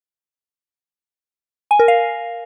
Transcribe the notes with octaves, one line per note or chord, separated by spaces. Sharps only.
G#5
A#4
F5